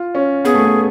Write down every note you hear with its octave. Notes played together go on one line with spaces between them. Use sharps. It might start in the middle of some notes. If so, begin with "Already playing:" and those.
Already playing: F4
C#4
B3 G#4
A3
B3